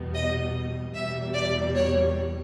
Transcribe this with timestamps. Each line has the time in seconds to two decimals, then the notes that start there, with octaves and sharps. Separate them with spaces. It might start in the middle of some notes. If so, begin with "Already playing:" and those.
Already playing: E2 B2 G3 B3
0.14 D#5
0.94 E2 B2 G3 E5
1.35 D5
1.75 C#5